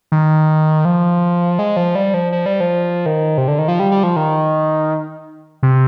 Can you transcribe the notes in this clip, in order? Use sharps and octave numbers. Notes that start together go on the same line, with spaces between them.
D#3
F3
G#3
F3
G3
F3
F3
G3
F3
D#3
C3
D3
D#3
F3
G3
G3
F3
D#3
C3